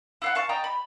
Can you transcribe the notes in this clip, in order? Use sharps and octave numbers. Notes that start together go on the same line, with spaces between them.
E4 F5 F#5
F5 A5 C#6
D#5 G5 A5 A#5
B5